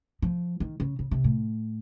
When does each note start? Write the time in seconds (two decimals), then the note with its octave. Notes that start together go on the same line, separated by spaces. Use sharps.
0.22 F3
0.60 D#3
0.80 C#3
0.99 C#3
1.11 C3
1.24 A2